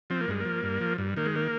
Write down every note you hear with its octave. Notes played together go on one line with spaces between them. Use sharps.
F3 C4
A#3
G2 G#3
F3 A#3
G2
F3
G2
D#3 A#3
G#3
A#3